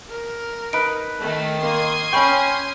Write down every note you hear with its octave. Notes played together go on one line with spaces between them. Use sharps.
A#4
D#4 B4 D7
D#3 A3
A#3 C6 D#6 G#6
C#4 G5 G#5 B5 C#6